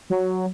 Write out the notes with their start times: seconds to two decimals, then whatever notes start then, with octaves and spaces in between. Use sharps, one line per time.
0.10 F#3